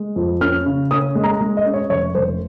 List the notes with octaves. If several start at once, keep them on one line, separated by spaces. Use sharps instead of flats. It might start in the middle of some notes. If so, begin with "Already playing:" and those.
Already playing: G#3
F2
C#4 F6
C#3
C#4 D#6
G#3
A#5
G#3
D#5
C#4
C#5
F1 C#5
F1 C5